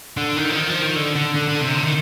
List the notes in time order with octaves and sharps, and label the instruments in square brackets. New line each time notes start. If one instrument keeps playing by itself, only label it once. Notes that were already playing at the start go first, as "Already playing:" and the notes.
[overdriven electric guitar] D3
D#3
F3
D#3
F3
D#3
D3
D3
D3
D3
C3
D3
D#3